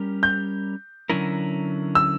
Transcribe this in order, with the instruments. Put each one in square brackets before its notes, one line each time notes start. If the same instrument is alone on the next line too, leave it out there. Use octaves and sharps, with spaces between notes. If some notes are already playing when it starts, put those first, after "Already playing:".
Already playing: [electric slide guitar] G3 C#4 G4 A#4
[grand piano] G6
[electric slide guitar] D3 F#3 C#4 E4 A#4
[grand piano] E6